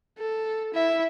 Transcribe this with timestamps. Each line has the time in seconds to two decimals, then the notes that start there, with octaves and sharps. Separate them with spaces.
0.18 A4
0.74 E4 E5